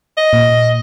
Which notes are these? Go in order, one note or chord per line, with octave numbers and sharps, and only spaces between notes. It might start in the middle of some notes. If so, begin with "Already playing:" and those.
D#5
A#2